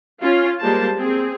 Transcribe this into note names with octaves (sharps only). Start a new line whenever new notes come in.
C#4 F4
G3 G#3 A#3 C5 A5
C4 G#4